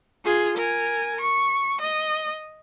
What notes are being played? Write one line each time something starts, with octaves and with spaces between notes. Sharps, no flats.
F4 G#4
A#4 G#5
C#6
D#5